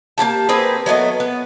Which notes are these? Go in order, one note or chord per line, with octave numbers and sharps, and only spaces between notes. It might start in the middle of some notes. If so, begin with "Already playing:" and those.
A#3 F4 G4 A5
A#3 C4 G#4 B4
F#3 A3 B3 D#5
B3